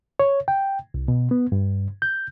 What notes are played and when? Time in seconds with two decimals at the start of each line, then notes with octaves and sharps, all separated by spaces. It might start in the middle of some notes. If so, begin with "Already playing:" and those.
0.20 C#5
0.48 G5
0.94 C2
1.08 B2
1.31 B3
1.52 G2
2.02 G6